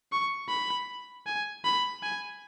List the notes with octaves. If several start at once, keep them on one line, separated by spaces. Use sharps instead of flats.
C#6
B5
G#5
B5
G#5